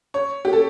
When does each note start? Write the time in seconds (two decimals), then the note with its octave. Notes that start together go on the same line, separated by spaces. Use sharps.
0.14 C#5
0.45 G4
0.53 A4